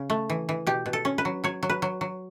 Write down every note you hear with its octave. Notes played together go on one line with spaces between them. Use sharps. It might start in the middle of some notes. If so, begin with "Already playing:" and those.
Already playing: C#3
A3
E3
E3
B2 G4
B2
A4
C#4
B4
F#3
F#3 C#5
F#3
B4
F#3
F#3